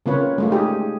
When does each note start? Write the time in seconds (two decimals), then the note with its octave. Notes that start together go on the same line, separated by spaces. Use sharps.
0.06 C#3 A#3 C4 F4 B4 C#5
0.38 G#3 A3 F4
0.51 D#4 G4 G#4